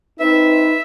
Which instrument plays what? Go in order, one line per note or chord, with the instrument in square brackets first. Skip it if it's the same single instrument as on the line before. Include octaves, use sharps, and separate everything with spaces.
[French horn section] C4 D#4 B4 [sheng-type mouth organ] E5